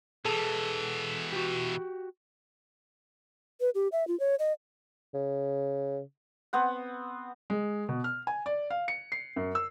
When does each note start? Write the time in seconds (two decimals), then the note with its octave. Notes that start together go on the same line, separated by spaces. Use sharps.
0.25 B2 E3 G#4 A4 A5
1.33 F#4 G4
3.61 B4
3.75 G4
3.92 E5
4.08 F4
4.20 C#5
4.39 D#5
5.14 C#3
6.53 B3 C4 F#5
7.50 G#3
7.89 B2
8.04 F6
8.27 G#5
8.46 D5
8.70 F5
8.88 C#7
9.12 C7
9.36 F#2
9.55 E6